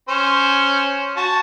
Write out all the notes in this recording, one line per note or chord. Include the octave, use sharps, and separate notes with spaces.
C#4 C5
F#4 A5